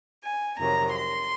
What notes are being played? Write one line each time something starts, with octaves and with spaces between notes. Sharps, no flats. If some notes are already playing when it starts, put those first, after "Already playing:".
G#5
F2 C3 D#3 F#3 A#5
C6